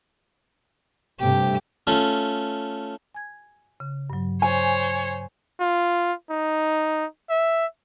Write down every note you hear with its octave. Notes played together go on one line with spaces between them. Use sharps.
G2 C3 A3 G4
A3 C#4 F4
G#5 G#6
C#3
G2 F#3
C5 C#5 G#5
F4
D#4
E5